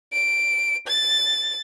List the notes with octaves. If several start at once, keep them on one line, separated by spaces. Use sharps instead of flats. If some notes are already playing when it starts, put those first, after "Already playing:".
D7
A6